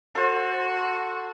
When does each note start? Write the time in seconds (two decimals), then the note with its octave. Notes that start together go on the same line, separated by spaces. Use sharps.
0.15 F#4 A4 C5